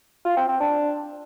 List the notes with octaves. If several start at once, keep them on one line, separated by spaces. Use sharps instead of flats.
F4
C4
C4
D4